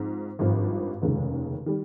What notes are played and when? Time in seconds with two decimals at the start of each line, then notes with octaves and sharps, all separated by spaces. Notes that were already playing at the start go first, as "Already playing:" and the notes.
Already playing: G#2 F3 C4
0.39 G#1 G2 F3 C4 F4
1.02 F1 D#2 C#3 G#3
1.66 D#3 G3